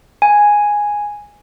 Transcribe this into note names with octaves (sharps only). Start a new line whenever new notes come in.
G#5